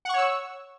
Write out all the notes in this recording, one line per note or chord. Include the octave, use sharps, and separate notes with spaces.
C#5 F#5 C#6 E6